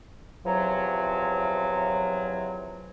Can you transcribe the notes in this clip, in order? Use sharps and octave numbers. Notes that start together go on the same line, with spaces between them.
E2 C3 F3 F#3